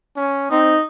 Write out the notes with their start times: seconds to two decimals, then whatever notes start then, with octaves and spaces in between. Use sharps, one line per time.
0.16 C#4
0.51 C4 D#4